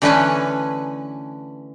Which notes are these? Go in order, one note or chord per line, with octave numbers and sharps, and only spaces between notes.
D3 E3 A3 C#4 B4 G#5